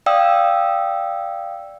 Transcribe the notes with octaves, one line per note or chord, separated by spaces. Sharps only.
D5 F5 G5 D#6 E6